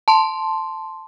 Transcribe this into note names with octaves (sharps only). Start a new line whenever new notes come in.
A5 C6